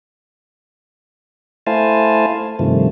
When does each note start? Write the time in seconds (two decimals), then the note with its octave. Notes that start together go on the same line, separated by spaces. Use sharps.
1.67 A3 E4 C5 F5 G#5 A5
2.59 G2 C3 D#3 F3 A3